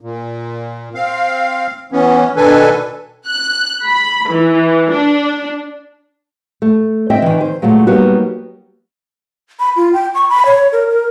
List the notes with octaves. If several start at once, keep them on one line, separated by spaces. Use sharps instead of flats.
A#2
C4 F5
E3 B3 C#4
B2 D#3 D4 A4 B4 G#5
F#6
B5
E3
D4
A3
C4 D#5 E5 G5
D#3 E3
C5
A#2 F#3 G#3 A3
F#3 G3 A#3 B3 D#4 F#4
B5
F4
G5
C#6
B5
C#5
A#4
A#4